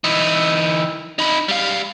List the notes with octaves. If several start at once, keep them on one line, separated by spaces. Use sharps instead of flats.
E3 D#4
D#4 B5
G3 F5